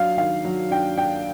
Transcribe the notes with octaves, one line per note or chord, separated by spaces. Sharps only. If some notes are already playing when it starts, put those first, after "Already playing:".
Already playing: F#3 D4 F5
D#3 F5
F#3
D4 G5
D4 G5